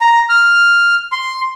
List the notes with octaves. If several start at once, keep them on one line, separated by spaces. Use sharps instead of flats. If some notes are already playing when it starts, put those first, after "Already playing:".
A#5
F6
C6